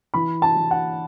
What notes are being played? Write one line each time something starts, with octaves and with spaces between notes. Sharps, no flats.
E3 B5
A5
E3
F#5